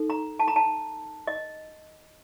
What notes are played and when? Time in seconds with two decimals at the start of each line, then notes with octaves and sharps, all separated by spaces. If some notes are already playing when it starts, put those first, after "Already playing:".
Already playing: D#4 A4
0.10 A#5
0.39 A5
0.48 A#5
0.56 A5
1.27 D#5